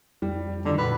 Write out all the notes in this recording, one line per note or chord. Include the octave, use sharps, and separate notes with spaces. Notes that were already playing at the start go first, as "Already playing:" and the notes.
F2 G3
G2 D3 D#3 F3
D2 A#2 B4